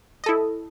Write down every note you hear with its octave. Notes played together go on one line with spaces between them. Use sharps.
E4 A4 D#5